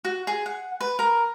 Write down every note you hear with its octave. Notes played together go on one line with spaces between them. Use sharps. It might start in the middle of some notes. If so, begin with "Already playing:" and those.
F#4
G#4
F#5
B4
A#4